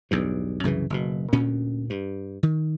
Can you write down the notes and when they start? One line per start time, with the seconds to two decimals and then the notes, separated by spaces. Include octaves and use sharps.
0.11 B1 E2 G2
0.63 C2 F#2 C#3 E3
0.90 F#1 B2
1.33 D2 A#2 C#4
1.90 G2
2.43 D#3